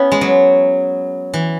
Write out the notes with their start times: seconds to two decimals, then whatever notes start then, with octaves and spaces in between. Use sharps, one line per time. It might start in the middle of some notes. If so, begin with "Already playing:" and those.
Already playing: B3 C#4 E4
0.12 G#3
0.21 F#3
1.34 E3